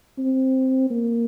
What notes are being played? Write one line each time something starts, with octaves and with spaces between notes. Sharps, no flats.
C4
A#3